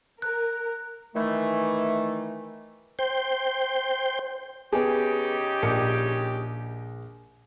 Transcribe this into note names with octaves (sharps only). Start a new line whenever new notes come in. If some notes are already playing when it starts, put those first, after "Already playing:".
A#4 F#6
D#3 E3 A3
C5 G5
C#3 B3 D#4 G4 G#4
A#1 A#4 C#7